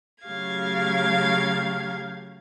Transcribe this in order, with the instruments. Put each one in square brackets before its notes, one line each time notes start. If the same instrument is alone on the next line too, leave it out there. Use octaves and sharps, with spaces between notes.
[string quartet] C#3 F#3 A3 G4 F5 G#6